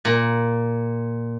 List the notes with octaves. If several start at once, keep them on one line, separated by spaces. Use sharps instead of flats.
A#2